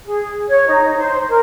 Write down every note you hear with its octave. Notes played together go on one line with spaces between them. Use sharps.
G#4
C#5
D#4
C5
A#4